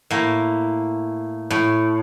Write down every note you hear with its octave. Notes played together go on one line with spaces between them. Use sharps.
A2 A#3
A2